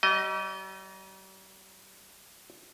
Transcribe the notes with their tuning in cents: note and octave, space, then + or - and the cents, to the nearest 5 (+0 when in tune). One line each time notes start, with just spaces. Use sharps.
G3 -45 D#5 +0